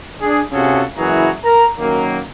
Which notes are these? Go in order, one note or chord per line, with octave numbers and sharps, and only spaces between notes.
D4 G#4
C3 C#4 F4 F#4 G#4 A4
F#1 E3 E4 F#4 G#4 A#5
A#4 A#5
F#2 D#3 F#3 A#3